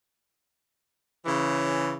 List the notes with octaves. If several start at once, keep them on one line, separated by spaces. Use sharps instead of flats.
C#3 E3